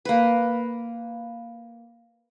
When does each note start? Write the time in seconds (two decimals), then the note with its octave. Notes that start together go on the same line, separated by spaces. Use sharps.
0.05 A#3 B4